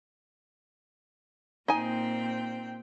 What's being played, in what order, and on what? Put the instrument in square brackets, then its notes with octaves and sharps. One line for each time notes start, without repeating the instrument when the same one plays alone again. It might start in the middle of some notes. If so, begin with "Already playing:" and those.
[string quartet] A#2 C4 G5 [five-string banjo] D#4 G#5